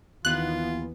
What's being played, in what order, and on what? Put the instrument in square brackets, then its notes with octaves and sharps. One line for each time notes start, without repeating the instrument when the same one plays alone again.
[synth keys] D#2 D#3 B3 [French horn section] E3 [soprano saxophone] F4 [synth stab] F#6